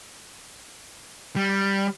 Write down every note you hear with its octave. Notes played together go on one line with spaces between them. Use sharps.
G3